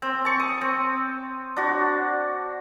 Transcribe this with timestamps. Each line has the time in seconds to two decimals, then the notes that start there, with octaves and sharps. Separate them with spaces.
0.02 C4
0.25 A5 C#6
0.40 D#6
0.61 C4
1.57 D4 F#4